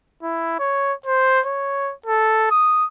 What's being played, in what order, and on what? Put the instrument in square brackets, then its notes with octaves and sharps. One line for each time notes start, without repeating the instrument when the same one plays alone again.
[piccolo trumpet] E4
C#5
C5
C#5
A4
D#6